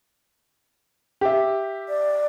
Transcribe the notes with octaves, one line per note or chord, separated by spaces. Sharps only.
G4 E5
D5